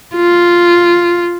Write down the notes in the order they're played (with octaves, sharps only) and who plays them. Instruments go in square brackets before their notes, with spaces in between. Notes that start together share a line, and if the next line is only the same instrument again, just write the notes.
[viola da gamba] F4